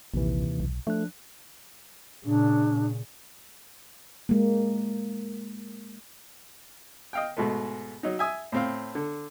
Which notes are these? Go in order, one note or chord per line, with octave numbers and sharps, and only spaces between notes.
A#1 D#2 C3 E3
B1
F3 A3 D4 F#6
A#2 C#3 D4
G#3 A#3
D#5 F5 G5
G#2 B2 G#3 A3
F#3 D#4
E5 G#5 D#6
A2 C4 F5
D3